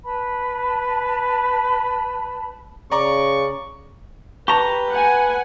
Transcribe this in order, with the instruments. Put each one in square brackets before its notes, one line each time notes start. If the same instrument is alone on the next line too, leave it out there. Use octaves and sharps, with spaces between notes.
[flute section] B4 A5 B5
[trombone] C#3 [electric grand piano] D5 A#5 D6 [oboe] C#6
[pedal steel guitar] G4 A#5 [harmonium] B4 [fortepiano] A5 C#6
[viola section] F#5 G#5